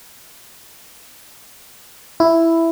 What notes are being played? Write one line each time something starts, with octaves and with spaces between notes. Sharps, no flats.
E4